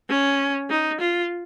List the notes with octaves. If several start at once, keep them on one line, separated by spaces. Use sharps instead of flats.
C#4
D#4
F4